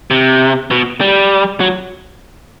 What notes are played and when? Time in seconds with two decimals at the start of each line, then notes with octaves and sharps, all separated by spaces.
0.11 C3
0.71 B2
1.01 G3
1.60 F#3